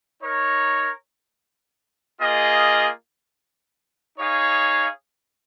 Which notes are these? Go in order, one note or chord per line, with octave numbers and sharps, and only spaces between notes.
D#4 A#4 C#5
A#3 F4 G#4 D#5
D#4 G#4 C#5 F5